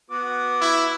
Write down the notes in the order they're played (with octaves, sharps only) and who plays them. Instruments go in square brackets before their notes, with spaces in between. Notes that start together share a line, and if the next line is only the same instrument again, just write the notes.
[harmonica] B3 F#4 D6
[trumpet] E4